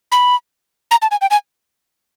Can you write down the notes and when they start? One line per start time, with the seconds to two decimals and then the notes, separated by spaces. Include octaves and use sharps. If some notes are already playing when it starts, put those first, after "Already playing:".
0.12 B5
0.91 A#5
1.02 A5
1.11 G#5
1.21 G5
1.31 G#5